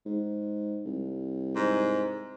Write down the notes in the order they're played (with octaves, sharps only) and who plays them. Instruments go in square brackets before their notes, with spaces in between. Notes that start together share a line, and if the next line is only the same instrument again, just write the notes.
[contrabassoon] G#2
C2
[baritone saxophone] G#2